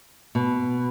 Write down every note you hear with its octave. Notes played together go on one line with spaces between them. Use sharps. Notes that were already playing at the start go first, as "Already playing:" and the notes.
B2